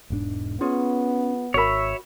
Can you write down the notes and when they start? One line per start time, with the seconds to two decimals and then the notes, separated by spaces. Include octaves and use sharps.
0.10 E1 G#2 D4
0.61 B3 C#4 F4 G#4 C#5
1.54 G#1 F#4 A#4 C#5 E5 B5